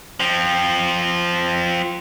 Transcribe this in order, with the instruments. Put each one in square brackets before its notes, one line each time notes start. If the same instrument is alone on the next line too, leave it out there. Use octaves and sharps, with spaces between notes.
[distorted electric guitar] F3 C4